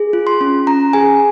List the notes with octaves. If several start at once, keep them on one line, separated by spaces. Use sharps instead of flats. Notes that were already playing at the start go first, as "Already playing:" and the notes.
Already playing: G#4
F4
C6
C#4
C#4 A#5
G#4 G#5